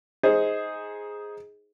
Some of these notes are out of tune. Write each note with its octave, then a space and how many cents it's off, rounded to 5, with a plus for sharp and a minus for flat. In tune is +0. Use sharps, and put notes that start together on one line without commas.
D#4 +15 G#4 +0 C5 +0